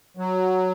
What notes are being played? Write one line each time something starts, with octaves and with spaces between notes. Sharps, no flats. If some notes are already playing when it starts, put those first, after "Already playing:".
F#3